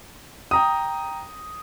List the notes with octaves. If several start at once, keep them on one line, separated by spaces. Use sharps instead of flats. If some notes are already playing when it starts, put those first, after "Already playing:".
G5 A#5 D#6